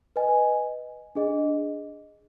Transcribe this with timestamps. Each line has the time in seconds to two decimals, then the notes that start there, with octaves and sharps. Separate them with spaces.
0.16 B4 D#5 G#5
1.15 D4 G#4 D#5